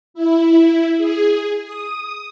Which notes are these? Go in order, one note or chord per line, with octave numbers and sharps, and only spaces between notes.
E4
G#4
D#6